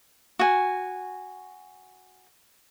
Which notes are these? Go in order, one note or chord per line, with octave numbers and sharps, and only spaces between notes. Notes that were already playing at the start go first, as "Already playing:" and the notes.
F#4 G#5